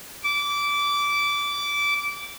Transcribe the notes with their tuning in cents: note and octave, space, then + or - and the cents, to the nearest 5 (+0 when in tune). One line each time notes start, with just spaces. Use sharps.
D6 -20